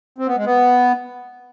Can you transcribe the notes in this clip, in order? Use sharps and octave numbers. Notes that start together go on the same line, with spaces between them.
C4
B3
G#3
B3